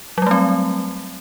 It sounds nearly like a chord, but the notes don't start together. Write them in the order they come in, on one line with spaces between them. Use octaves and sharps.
F#3 G3 A3 C4